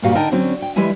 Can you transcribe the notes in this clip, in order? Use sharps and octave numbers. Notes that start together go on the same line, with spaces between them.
D2 G2 A#2 G3 F#4 F5
D3 D#4 A#4 D#5 G5 A5
D3 F#3 C4 C#4
G5
E3 G3 G#3 E4 G#5